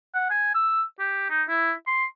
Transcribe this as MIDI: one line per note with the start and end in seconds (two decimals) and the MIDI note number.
0.15 0.30 78
0.31 0.53 80
0.55 0.82 88
1.00 1.26 67
1.30 1.43 63
1.49 1.72 64
1.87 2.05 84